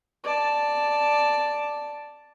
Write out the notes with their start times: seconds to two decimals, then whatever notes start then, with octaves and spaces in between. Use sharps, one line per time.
0.24 D5 A5